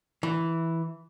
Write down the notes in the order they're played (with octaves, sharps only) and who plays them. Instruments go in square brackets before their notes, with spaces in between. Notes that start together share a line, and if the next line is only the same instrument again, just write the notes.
[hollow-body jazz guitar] E3